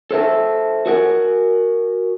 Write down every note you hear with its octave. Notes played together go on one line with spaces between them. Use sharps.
A4 C5 E5 A5
F#4 A#4 F#5